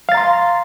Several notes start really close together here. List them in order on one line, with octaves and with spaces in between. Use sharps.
F5 A6 A#5 C6